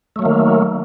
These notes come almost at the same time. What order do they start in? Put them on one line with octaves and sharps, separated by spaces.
A3 F#3 A#3 D#3